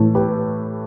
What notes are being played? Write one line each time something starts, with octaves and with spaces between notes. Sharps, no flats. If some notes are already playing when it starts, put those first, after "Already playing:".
Already playing: A2 E3 A3
G4 B4